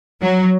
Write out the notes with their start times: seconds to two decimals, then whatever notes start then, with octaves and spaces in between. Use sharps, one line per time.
0.22 F#3